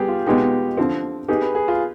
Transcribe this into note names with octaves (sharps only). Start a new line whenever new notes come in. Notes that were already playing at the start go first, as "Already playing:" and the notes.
Already playing: G3 B3 G4 G#4
F4
B2 G#3 B3 D#4 G4 G#4
D3 F3 C4
B3 D#4 G4 G#4
B4
G#4
F4